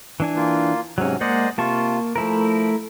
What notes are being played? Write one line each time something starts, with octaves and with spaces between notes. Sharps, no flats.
E3 D4 G#5
A#3 F4
G#2 C3 F#3 C#4
G#3 A#3 C5 D5 D#5 F#5
C3 A#3 F4 A5 C#6
F3 A3 E4 A#4